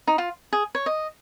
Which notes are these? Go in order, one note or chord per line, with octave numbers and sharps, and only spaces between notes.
D#4
F4
G#4
C#5
D#5